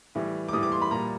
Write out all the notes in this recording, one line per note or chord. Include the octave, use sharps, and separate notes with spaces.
A2 E3 G3
D6
A2 E3 G3 D#6
D6
C6
B5
A#2 G3 A#5